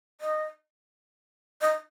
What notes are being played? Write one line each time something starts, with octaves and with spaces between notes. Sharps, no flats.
D#5
D#5